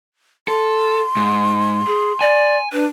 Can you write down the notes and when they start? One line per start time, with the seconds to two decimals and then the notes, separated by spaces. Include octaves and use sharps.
0.48 A4 C6
1.17 G#2
1.87 G#4
2.21 D5 G#5
2.73 D4 B4